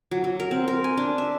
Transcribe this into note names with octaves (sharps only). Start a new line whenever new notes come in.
F#3
F#3
A#4
C4
A#4
G#5
D4
E5